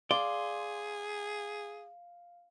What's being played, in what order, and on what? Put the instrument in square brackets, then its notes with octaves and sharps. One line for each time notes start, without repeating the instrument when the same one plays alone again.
[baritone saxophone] G#4 [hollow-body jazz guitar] D5 [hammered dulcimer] F5 [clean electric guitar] C6